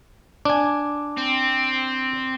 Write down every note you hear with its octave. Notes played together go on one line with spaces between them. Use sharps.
D4 G#5 D6
C4